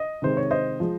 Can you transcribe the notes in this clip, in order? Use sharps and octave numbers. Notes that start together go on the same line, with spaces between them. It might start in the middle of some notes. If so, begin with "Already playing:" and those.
Already playing: D#5
C3 D#3 G#3 C5
C#5
C5 D#5
F3 G#3